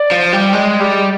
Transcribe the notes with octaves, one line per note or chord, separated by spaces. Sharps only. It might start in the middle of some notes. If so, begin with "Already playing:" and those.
Already playing: D5
F3
G3
G#3
G3